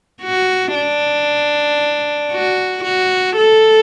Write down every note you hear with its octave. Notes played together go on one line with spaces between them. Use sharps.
F#4
D4
F#4
F#4
A4